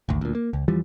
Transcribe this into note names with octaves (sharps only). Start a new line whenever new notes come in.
G#1 D2
D2 A#2
A#3
C#2
E2 E3 F3 G3